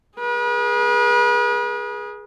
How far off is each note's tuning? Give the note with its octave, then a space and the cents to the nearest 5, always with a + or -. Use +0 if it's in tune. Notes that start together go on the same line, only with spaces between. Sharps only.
G#4 +0 B4 -40